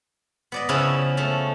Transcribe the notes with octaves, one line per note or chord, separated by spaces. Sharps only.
B3 D5 D#5
C#3 F3 C#4 E4 B4
F3 A3